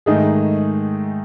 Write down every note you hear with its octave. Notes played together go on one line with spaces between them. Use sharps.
G#2 D#3 A3 D#4 G#4